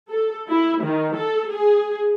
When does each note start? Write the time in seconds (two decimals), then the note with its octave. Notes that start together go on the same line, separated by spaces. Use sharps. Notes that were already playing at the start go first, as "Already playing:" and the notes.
0.10 A4
0.49 E4
0.82 D#3
1.16 A4
1.51 G#4